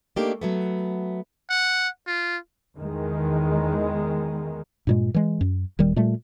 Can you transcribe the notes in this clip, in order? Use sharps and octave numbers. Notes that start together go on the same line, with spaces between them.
A3 A#3 D4 D#4 G4
F#3 A3 B3
F#5
F4
E2 D#3 G#3
G2 A#2 G#3
E3 G#3
F#2
D#1 D#3 G3
A#2 G3 A3